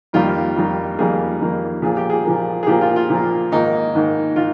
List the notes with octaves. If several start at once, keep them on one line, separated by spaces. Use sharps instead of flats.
F2 D#3 G3 A#3 F4
F2 D#3 G3 A#3
F2 D#3 G3 A#3 G#4
F2 D#3 G3 A#3
A#2 F3 A#3 G#4
G4
G#4
A#2 F3 A#3
G#4
A#2 F3 A#3 G4
F4
F4
A#2 F3 A#3
G#2 D#3 A#3 D#4
G#2 D#3 A#3
D#3 F4